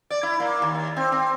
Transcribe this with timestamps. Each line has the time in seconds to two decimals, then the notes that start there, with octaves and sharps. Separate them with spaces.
0.10 D5
0.23 E4
0.40 A#3
0.62 D#2
0.96 C4
1.12 C4